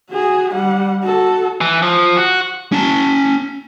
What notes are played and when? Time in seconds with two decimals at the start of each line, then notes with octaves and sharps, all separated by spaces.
0.11 F#4 G#4
0.55 G3 F#5
1.03 F#4 A4
1.61 E3
1.82 F3
2.18 F#4
2.72 C#4 A5